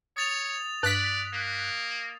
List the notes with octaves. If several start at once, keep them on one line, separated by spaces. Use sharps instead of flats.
C#5 D#6 A6 F7
G2 D5 F#6 B6
A#3